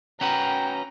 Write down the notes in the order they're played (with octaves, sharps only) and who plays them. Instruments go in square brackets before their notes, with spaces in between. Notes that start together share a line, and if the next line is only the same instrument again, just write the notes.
[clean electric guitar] C#4 F#4 B4 [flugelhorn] G5 [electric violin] A#5